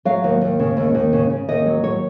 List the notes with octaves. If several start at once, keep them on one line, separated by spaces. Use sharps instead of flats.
F#3 F5
D#2
D#2
C#3
D#2
D#2
C#3
C#3
D#2 D#5
F#3
D#2 C#5